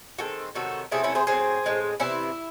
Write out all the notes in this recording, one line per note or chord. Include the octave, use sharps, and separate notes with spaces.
D#3 G#3 C4 F#4 A4
C3 D#3 F#3 F#4 A4
C3 F#3 A3 C4 E4 G#4
C#4 E4
G#4 C5
A2 F#3 C4 G#4 C5
A2 G#3 C4
C3 E3 C4 C#4 E4